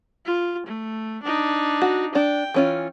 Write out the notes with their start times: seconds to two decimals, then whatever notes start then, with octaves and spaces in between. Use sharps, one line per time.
0.25 F4
0.67 A3
1.23 D4 D#4
1.82 F#4
2.15 D4 G5
2.54 E3 C#4 F4